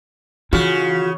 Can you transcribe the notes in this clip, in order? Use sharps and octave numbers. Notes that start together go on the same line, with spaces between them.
C#3 E3 F4 F#4